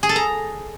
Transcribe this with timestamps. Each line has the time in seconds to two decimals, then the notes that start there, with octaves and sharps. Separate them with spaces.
0.03 G#4
0.09 A4
0.16 A#5